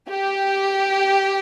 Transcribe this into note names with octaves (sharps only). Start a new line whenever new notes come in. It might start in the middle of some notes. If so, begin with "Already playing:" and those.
G4